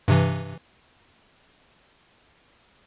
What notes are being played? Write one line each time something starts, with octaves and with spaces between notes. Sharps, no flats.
G2 C3 E3